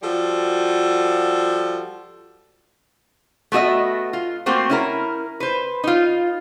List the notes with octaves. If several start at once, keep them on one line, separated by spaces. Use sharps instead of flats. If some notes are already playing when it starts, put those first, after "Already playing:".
F3 G3 F#4 A4
A3 B3 F#4 D#5 E5
F4
A3 A#3 C4 F#4 C5
C#4 E4 A#4
B4 C5
D#4 F4